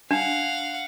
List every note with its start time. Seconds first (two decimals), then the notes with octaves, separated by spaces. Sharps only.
0.11 D4 F5 F#5